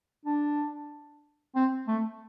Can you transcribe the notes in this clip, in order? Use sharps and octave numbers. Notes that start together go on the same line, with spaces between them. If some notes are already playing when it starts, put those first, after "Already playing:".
D4
C4
A3